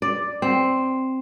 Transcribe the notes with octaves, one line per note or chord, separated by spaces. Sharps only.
D5
C4